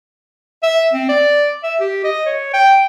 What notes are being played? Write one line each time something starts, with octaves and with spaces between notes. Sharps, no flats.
E5
C4
D5
E5
G4
D#5
C#5
G5